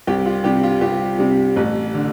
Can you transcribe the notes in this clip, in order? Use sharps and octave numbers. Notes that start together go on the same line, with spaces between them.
C2 G4
F4
C3 G3 G4
F4
C2 G4
C3 G3
A1
D3